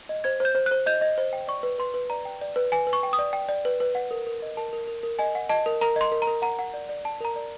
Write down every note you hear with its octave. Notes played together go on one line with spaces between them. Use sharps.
D#5
C5 G#6
C5 G6
C5
C5 F#6
D#5 G6
D#5
C5
G5
D5 C#6
B4
B4 C6
B4
D5 A#5
G5
D5
B4
B4 G#5
B4
C#6
G5
D#6
D5
G5
D5
B4
B4
F#5
A#4
A#4
D#5
A#4 A5
A#4
A#4
A#4
D#5 G#5
F#5
D#5 A5
A#4
A#4 A#5
D#5 C6
A#4
A#5
A#4
F#5 A#5
F#5
D5
D5
D5 A5
A#4 A#5
D5